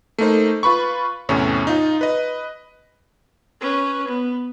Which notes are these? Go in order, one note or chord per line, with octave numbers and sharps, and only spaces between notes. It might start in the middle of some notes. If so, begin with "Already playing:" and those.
A3 A#3 D#4 C5
F4 B4 B5 C#6
E2 A2 C3 C#4
D#4 F4
B4 D#5
C#4 B4
B3